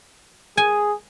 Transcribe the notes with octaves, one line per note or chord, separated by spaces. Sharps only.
G#4 G#5